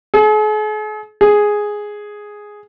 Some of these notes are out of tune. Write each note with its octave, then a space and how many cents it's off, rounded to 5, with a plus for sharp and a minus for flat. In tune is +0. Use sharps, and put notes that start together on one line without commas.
G#4 +45
G#4 +0